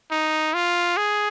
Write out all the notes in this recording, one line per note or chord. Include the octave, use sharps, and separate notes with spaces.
D#4
F4
G#4